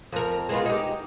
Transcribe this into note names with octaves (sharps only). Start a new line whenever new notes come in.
F2 A#4
G#3 B3 F4
D#4 G4